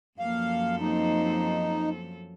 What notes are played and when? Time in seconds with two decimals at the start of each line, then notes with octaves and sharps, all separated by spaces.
0.19 F#2 F3 A#3 A4 F5
0.80 A#3 C4 D#4